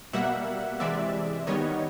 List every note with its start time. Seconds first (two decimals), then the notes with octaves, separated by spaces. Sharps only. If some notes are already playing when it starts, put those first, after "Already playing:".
0.13 B2 G3 A#3 E5 F#5
0.80 C3 E3 G#3 D5 E5
1.47 D#3 G3 B3 C#5 D#5